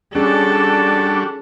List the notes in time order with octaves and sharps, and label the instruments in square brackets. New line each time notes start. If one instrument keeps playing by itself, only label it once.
[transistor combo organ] G3 D4 F#4 [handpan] C#4 G#4 [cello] A4